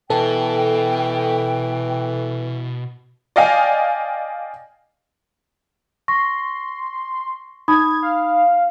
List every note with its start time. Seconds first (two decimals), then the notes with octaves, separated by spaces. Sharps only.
0.10 B2 E3 A4 G5
3.36 D5 D#5 F5 G5 G#5
6.08 C6 C#6 A#6
7.68 D#4 B5 D#6 G#6
8.02 F5